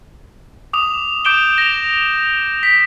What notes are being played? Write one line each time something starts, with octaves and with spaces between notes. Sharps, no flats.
D6 D#6 F7
D6 G6 D7 E7 G7
A#6 F7
B6